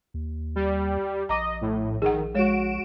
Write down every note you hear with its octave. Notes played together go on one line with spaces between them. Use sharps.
D#2
G3
A#1 D#5 A#5 D6
A2
D#3 G#4 F#5
G#3 F#4 C#5 D7 E7